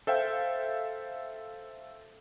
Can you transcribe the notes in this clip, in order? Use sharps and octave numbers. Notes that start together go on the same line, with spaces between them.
A4 C5 E5 F5 G5